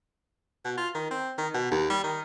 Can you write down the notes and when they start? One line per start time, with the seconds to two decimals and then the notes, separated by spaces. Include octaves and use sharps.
0.65 B2
0.78 F4
0.95 D#3
1.11 C4
1.38 D#3
1.54 B2
1.72 D#2
1.90 G3
2.04 D#3